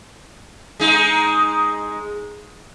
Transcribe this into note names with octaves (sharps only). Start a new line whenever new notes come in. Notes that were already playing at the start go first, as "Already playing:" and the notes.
G#3 D#4